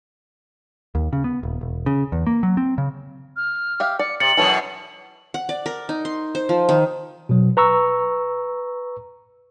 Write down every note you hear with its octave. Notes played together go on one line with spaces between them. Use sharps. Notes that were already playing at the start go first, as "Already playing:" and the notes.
D#2
C#3
B3
D#1
E1
C#3
E2
A#3
F#3
C4
C#3
F6
G4 E5 F5
D5 C#7
C3 A6 C#7 F#7
F#2 B2 E3 A4 C#5
F#5
D5
A#4
D#4
C6
C5
F3
D#3
B2 F#3
B4 A#5 C#6 E6